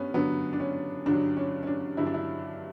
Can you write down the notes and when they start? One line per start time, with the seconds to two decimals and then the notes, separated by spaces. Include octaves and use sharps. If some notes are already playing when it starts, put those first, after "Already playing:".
Already playing: G2 B3 C#4
0.14 G2 D3 F#3 B3
0.53 D4
0.60 C#4
1.06 G2 D3 F#3 D4
1.37 C#4
1.63 C#4
1.67 D4
1.97 G2 D3 F#3 E4
2.06 D4
2.14 E4